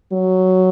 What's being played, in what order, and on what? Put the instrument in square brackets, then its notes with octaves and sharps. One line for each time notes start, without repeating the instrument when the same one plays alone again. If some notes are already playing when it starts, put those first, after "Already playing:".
[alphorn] F#3